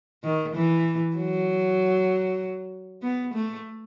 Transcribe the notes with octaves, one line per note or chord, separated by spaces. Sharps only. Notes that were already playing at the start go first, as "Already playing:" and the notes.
D#3
E3
F#3
B3
A3